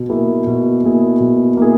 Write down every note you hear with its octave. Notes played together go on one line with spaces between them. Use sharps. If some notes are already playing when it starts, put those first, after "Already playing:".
Already playing: B2
A#3 E4 G#4
B2
A#3 E4 G#4
B2
A#3 E4 G#4